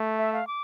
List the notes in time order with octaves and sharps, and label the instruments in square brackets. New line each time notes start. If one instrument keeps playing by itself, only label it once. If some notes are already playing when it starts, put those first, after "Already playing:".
Already playing: [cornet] A3
[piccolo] E5
F5
D6